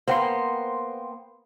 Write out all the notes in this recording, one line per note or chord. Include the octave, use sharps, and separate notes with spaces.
A#3 B3 C5 G5 C6